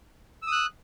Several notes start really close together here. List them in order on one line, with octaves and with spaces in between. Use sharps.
E6 D#6 F#6